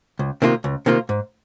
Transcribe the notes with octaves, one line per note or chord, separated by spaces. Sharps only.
C#2
C3 D#3 A#3 F4
C#2
C3 D#3 A#3 F4
G#2